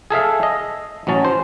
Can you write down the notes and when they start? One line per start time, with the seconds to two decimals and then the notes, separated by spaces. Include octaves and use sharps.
0.10 G#4 A4 E5 F5
0.43 D#5
1.07 A1 F#3 C#4 A5
1.25 C5